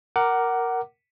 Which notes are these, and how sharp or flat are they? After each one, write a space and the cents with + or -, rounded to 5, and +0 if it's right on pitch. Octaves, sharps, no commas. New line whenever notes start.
A#4 +0 F#5 +15 D6 +0